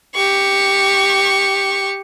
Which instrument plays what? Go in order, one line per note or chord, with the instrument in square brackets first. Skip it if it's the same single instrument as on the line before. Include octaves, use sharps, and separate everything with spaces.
[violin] G4 C#6